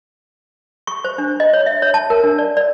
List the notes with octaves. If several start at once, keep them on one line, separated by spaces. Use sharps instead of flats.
C#6
C5
D4
D#5
C#5
E5
C#5
A5
A#4
D4
D5
D5